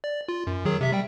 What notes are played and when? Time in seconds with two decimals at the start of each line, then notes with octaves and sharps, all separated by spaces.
0.04 D5
0.28 F4
0.47 F#2
0.65 D#3 F#3 G#4
0.81 C3 E5 B6
0.92 G3 G5